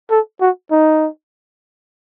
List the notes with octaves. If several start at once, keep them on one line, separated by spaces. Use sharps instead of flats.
A4
F#4
D#4